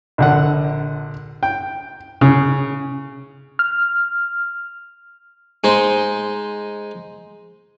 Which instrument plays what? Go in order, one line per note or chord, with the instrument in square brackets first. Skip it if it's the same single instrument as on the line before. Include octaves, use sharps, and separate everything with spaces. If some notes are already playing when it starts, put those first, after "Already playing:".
[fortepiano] A#1 D3 F#5
G5
C#3
[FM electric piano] F6
[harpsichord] G#3 D#4 C5